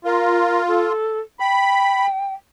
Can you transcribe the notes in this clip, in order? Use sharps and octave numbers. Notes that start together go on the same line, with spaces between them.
F4 A#4
A4
G5 B5